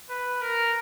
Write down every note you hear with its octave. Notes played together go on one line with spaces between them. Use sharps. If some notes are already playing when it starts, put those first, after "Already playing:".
B4
A#4